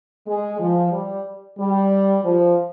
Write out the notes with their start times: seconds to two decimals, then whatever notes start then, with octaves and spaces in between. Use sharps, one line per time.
0.27 G#3
0.60 F3
0.92 G3
1.58 G3
2.24 F3